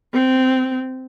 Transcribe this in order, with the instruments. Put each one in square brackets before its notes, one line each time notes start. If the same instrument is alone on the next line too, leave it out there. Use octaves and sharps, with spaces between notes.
[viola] C4